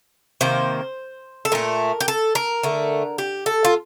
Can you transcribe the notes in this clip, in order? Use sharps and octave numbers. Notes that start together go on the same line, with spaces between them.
C3 D#3 A#3 C5
A4
A#2 A3 A#4
G4
A4
A#4
D3 A3
G4
A4
F4